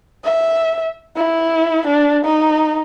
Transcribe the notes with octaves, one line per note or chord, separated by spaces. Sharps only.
E5
E4
D4
D#4